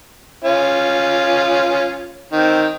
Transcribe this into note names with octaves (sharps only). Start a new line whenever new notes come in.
C#4 F4
D#3 C4